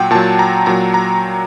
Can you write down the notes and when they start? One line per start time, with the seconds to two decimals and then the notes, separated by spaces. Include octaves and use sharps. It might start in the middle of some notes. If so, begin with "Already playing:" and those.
Already playing: A#2 F#3 F#5 G5
0.11 A#2 A5
0.15 F#3
0.39 A#5
0.66 A#2 F#3 A#5
0.94 A#5